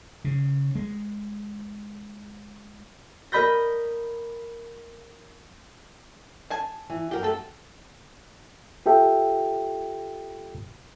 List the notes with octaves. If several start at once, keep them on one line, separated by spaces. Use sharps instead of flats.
C#3
G#3
A#4 D#5 B5 G6 A#6
G#5 A5
E3
F#2 F#4 G4 A#4 G5
A3 A4
F4 G4 A4 E5 G5